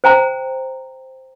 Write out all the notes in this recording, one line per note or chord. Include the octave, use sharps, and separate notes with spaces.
C5 G5 A#5